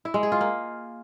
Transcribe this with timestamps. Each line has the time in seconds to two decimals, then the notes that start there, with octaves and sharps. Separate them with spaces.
0.05 E4
0.14 G#3
0.23 G#4
0.32 F4
0.41 A#3